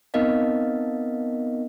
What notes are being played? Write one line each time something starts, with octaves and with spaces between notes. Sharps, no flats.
B3 C4 D#4 A#4 D#5 F5